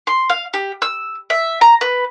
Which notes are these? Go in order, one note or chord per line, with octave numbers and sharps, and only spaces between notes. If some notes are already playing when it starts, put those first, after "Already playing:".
C6
F5
G4
E6
E5
A#5
B4